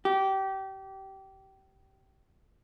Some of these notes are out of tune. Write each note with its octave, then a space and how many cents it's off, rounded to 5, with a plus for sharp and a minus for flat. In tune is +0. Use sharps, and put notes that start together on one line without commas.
G4 -25